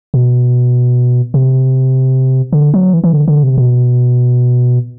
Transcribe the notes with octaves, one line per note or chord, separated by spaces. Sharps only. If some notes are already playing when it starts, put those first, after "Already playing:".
B2
C3
D3
F#3
E3
E3
D3
D3
C3
B2